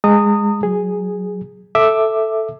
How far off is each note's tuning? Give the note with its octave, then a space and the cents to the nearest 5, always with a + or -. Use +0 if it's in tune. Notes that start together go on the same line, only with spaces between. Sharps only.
G#3 -15 A#5 -40 D#6 -10
F#3 +0 G#4 -5
A4 +0 E5 +0 D6 +10